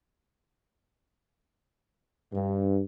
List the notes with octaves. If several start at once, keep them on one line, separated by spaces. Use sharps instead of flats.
G2